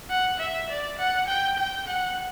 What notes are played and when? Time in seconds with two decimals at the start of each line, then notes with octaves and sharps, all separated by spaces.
0.10 F#5
0.39 E5
0.70 D5
0.99 F#5
1.28 G5
1.58 G5
1.88 F#5